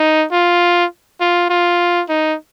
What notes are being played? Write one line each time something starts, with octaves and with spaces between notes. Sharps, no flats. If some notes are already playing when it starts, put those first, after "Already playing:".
Already playing: D#4
F4
F4
F4
D#4